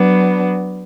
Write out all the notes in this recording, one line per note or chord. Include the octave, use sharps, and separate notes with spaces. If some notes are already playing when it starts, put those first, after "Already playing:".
Already playing: F#3 B3 D4